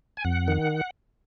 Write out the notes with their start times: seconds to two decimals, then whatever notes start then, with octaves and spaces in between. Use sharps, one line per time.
0.17 G#5
0.25 F2 F#5
0.48 D#3